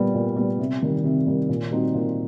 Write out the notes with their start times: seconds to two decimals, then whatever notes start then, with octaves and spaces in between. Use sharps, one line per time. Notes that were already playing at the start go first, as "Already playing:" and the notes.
Already playing: A#2 G3 B3
0.15 A#2
0.37 G3 B3
0.59 C3
0.82 D#3 G3
1.04 C3
1.27 D#3 G3
1.49 A#2
1.71 G3 C4 D#4 F#4
1.94 A#2